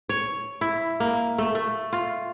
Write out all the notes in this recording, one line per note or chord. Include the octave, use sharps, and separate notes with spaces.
C#5
E4
A#3
A3
A3
F4